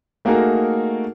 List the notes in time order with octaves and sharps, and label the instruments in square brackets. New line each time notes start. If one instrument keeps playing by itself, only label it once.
[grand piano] A3 A#3 D#4 F#4 G#4 A#4